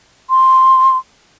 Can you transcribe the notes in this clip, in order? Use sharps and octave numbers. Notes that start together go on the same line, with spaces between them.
C6